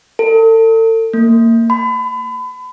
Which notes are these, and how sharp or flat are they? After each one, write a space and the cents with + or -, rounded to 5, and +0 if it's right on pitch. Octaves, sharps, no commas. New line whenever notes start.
A4 +40
A#3 -25
B5 +35